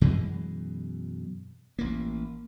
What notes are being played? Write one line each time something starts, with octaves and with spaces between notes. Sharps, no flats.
F#2 B2 E3 G#3
A1 A#3